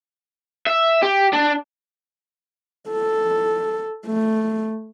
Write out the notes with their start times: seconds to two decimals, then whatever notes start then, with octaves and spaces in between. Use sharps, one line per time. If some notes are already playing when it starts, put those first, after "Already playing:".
0.66 E5
1.02 G4
1.33 D4
2.90 A4
4.06 A3